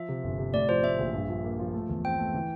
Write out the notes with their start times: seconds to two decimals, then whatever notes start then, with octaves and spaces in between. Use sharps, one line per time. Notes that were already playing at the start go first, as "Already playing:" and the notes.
Already playing: F3 E5
0.09 C3
0.24 G1
0.39 C3
0.54 A2 D5
0.69 F3 C5
0.83 A2 E5
0.99 A#1
1.14 G2
1.29 F3
1.44 A#3
1.59 F3
1.74 A3
1.89 E2
2.04 C4 G5
2.19 A3
2.34 E3